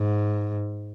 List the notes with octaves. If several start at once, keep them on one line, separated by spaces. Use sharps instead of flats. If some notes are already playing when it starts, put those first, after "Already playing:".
Already playing: G#2